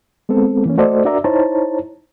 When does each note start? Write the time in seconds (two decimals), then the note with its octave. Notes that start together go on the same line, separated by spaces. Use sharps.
0.29 G#3 B3 C4 A4
0.65 E3 A#3 C#4
0.78 A3 F#4 A4 C5 D5 D#5
1.05 D4 F#4 A#4 D5 E5 A#5
1.24 D#4 E4 C5 C#5 A5 A#5